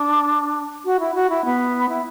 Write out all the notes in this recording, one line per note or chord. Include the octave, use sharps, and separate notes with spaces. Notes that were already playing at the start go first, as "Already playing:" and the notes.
Already playing: D4
F#4
E4
F#4
E4
B3
E4